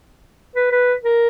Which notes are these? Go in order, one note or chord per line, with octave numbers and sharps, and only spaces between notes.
B4
B4
A#4